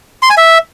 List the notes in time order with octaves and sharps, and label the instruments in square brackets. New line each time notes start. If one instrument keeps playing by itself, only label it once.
[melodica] C6
G#5
E5